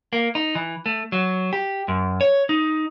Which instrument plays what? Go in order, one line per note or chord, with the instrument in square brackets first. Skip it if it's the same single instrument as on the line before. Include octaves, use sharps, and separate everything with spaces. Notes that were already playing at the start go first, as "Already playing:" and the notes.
[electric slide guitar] A#3
D#4
E3
A3
F#3
G4
F#2
C#5
D#4